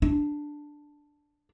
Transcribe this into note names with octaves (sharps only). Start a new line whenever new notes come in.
D4